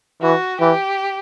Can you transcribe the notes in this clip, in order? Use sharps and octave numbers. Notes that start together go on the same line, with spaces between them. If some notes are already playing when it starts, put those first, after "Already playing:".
E3 F#4
E3 G4